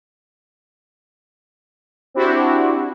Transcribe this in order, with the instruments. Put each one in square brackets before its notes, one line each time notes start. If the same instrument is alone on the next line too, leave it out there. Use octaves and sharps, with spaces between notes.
[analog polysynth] C4 D4 E4 F#4 G4